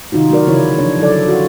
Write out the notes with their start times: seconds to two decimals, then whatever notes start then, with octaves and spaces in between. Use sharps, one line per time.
0.12 C3 D#3 D#4 F4 F#4
0.30 F#3 A3 F#4 A#4 D5
0.46 C#3 E3 C#4 E4 F4 C#5
0.78 F3 D4 C#5
0.99 D3 F#3 E4 A4 D5
1.26 F4 F#4